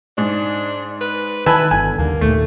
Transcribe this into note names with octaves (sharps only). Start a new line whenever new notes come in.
G#2 D4
B4
D#3 E4 B4 G#5 A5
G1 D3 G#5
D#2 D3 A#3
D#2 A#2 A3